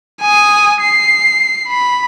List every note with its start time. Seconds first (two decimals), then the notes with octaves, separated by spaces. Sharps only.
0.21 G#5 D#6
0.81 C7
1.68 B5